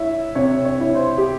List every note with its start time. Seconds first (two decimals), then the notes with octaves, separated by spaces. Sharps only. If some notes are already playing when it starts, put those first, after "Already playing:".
Already playing: E4 C#5 E5
0.35 C3 C#5
0.65 C#5
0.80 E4
0.95 C5
1.18 G4